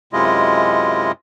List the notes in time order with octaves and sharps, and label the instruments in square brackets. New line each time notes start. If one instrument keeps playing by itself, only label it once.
[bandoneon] F#2 C3 G#3 E4 F4 D#5